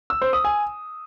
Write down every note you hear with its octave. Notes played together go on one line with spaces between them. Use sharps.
E6
C5
D#6
G#5